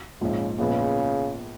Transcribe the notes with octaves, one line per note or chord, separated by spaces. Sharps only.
A#1 G#2 C#3 F3
A#1 A#2 C#3 F3 G#3 B3